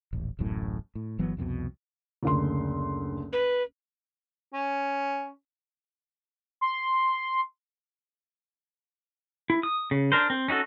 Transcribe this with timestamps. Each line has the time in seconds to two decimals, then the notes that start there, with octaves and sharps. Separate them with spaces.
0.13 D#1 A1
0.39 D1 A1 F#2 A2
0.95 A2
1.19 G1 E3 F#3 B3
1.37 C2 F2 G#2 B2
2.23 F#1 D2 C6
3.33 B4
4.54 C#4
6.61 C6
9.50 E4
9.63 D#6
9.91 C#3
10.12 D4 A#4 C5
10.30 C4
10.48 C#4 D#4 F#4 A4